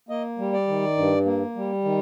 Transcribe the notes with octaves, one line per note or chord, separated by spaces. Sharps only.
A#3 D#5
G3
D5
D#3
G2
A#3
G3
D#3